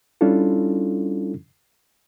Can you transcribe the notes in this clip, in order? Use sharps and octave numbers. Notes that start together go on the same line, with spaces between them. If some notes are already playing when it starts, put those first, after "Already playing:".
G3 C#4 D4 E4 F4 A4